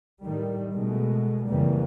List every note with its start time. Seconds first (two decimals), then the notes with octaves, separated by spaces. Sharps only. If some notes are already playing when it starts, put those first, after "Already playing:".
0.23 A2 D#3 G3
0.73 B2 G#3 A3
1.46 F2 C#3 E3 G3 A#3